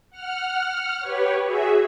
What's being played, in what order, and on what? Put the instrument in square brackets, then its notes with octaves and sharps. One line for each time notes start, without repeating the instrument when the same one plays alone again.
[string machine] F#5 F6
G4 B4 C#5
F#4 G#4 E5